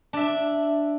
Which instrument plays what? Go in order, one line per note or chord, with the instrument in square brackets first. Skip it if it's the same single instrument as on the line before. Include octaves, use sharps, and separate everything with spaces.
[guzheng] D4 E5